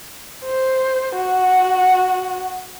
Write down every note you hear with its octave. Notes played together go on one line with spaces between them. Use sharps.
C5
F#4 F#5